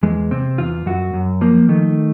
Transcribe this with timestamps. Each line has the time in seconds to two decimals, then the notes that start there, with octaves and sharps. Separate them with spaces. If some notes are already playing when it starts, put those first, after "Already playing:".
0.03 E2 G#3
0.31 C3 C4
0.58 E2 F4
0.86 F#2 F#4
1.14 F#2
1.41 F3 A#3
1.69 D#3 A3